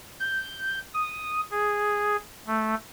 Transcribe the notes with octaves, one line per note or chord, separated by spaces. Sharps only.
G6
D#6
G#4
A3